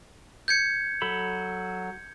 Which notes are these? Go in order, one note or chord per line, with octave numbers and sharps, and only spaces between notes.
G6 G#6 C#7
F#3 A4 B5